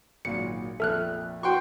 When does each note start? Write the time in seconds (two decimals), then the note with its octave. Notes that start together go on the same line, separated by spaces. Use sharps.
0.25 G#1 A#2 F#3 C#7
0.80 F1 A#1 A4 E5 F6 F#6
1.43 F#4 G5 C6 C#6